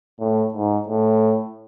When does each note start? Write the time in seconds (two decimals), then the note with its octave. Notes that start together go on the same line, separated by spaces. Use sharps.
0.20 A2
0.54 G#2
0.88 A2